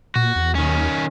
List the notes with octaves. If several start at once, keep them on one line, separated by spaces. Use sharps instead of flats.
A#2 F#4
E2
D#2 D#3 C#4